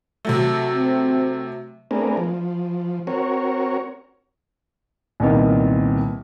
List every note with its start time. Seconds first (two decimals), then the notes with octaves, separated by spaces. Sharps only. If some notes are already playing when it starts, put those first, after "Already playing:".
0.25 C3 F#3 A3
0.74 C4
1.91 A3 B3 C4 D4 G#4 A#4
2.17 F3
3.07 C4 F#4 A#4 C#5
5.20 C2 A#2 D#3 B3